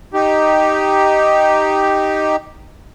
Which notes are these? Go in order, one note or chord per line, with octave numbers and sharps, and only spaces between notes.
D#4 G4